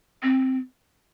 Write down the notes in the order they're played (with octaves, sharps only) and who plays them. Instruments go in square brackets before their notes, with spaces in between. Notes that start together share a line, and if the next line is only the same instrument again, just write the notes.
[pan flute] C4